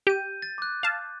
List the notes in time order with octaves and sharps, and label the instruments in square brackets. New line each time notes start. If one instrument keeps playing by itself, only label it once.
[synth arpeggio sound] G4 [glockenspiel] G6 D#7
[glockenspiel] A6
D6 F#6
[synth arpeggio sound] F5 A5